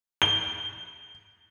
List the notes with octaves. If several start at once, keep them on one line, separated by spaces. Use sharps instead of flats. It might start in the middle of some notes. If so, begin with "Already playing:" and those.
G7